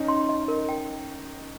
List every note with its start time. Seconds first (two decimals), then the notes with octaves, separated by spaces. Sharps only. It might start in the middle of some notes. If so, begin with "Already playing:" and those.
Already playing: C#4 D#4
0.08 C6
0.29 D#5
0.48 A#4
0.69 G5